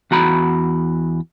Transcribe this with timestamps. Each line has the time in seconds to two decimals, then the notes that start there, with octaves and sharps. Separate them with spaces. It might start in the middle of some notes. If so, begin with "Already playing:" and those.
0.11 E2 F#4 A#5 B5